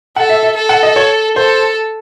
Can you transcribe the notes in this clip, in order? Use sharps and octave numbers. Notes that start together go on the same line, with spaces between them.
A4 F#5
E5
E5
A4
F#5
D#5
C#5
A4 C5